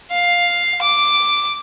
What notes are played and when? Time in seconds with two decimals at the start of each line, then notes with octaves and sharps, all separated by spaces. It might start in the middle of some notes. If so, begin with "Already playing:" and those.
0.11 F5
0.82 D6